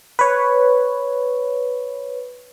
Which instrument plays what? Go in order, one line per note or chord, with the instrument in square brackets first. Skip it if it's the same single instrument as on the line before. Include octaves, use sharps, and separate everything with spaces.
[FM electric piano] B4 C#5